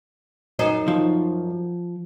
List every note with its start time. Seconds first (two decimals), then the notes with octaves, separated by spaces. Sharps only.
0.59 F#2 D#4 C5
0.88 F3